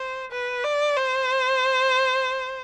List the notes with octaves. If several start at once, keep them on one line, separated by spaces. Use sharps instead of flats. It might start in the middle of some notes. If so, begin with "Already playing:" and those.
Already playing: C5
B4
D5
C5